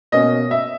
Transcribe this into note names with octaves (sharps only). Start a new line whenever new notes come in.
B2 A#3 C#4 D#5
E5